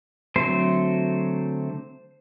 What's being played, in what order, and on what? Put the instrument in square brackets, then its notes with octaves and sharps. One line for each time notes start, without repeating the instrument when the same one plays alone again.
[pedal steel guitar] D3 F#3 A3 C4 C5